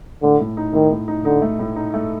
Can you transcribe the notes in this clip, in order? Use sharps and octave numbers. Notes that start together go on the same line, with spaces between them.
A2 D3
A2
D#4
A2 D#3
A2
D#4
D3 D#4
A3
A2
D#4
A3